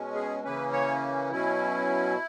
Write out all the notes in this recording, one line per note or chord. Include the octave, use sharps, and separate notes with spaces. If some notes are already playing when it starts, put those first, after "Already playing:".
Already playing: B2 G#3 C#4
G#4
C#3 E3 A#3 C#4 B4
C#5
B2 F#3 C#4 E4